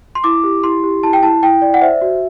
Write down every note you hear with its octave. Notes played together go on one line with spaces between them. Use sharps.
C6
E4 D6
G4
E4 C6
G4
E4 A5
G5
E4 A5
E4 G5
D5
F#5
C5 E5
F#4